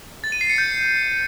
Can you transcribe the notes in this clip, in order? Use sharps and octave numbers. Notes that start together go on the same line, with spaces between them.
A6
D#7
C7
C#7
G6